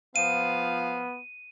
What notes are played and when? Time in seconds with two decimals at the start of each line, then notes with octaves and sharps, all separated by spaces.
0.16 F3 B3 F5 D#7